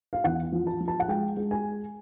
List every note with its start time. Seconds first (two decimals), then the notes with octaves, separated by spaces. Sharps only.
0.13 F5
0.24 E2 F#5
0.52 F3
0.67 A5
0.80 F3
0.88 A5
1.00 F#5
1.08 G#3 G5
1.37 G#3
1.51 G#5